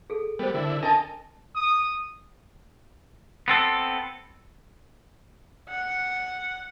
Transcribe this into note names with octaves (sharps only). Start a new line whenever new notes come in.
G#4 A4
G3 B3 A#4 C5
D3 E4
D4 A4 A#4 D#5 A5
D#6
B3 C4 A4
F#5